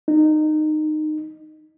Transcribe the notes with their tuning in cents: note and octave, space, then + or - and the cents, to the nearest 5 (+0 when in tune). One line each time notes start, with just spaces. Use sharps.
D#4 -20